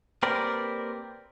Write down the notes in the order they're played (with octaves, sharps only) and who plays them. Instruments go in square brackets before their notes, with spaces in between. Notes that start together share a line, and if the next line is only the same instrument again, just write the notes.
[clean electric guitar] A#3 C4 G4 A#4 B4 D5